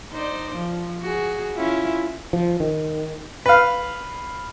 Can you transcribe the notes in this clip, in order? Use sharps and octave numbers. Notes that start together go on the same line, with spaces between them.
D#4 C5 D5
F3
F#4 G#4
C#4 E4 F4
F3
D#3
B4 F5